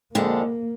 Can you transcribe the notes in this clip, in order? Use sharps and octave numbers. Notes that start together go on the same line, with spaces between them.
F2 D3 G#3 A#3